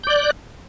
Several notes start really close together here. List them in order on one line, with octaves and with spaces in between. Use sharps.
G6 D5 F#6